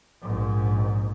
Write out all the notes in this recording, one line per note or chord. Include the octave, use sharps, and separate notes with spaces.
A#1 G#2